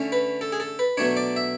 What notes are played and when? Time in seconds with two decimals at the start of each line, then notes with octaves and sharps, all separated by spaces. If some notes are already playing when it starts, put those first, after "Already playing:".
Already playing: D3 A3 C#4
0.12 B4
0.41 A4
0.52 G#4
0.60 A4
0.79 B4
0.97 B2 F#3 A3 D4 C#5
1.17 D5
1.36 E5